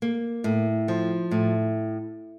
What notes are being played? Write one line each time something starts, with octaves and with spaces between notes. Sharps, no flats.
A#3
A2
F3
A2